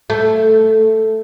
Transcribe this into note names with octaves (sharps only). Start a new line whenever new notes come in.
A3